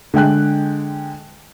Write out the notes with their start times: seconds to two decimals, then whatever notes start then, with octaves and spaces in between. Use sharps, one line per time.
0.14 D3 G#3 G5 F#6